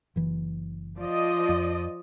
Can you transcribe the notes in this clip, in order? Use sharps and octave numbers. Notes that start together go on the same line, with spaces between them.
F#1 E3
F3 D5 D#5
F2